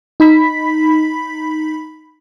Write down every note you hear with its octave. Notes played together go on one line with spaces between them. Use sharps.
D#4 B5 B6